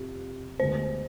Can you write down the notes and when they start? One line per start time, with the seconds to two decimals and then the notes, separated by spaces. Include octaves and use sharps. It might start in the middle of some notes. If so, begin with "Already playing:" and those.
Already playing: F2 C3 G4
0.60 D2 D3 G#3 B3 C5